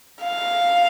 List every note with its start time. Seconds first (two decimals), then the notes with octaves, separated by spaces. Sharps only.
0.23 F5